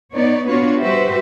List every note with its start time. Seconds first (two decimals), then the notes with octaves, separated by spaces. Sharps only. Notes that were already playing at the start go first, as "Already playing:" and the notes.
0.12 B3 D#4 C#5 D5
0.47 B3 D4 F4 F#4 B4 C#5
0.79 G3 F#4 G4 B4 C5 E5